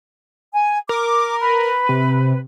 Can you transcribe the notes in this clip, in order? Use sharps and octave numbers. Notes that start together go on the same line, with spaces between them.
G#5
A#4 D6
B4
C3